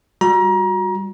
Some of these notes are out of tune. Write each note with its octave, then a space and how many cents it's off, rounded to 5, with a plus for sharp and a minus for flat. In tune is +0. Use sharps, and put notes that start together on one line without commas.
G3 +0 F#4 -25 A#5 +30